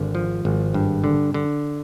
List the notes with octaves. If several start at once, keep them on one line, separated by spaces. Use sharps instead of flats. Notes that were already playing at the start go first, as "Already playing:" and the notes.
Already playing: G#1 D3
F3
G#1
G2
D3
D3